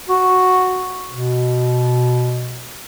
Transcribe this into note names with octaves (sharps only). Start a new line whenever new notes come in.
F#4
B2